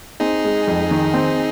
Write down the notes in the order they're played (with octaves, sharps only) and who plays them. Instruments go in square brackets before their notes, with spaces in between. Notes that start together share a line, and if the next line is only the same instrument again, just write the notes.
[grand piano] C4 [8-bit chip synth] D#4 G#4
[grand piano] G#3
F2
D#3
C4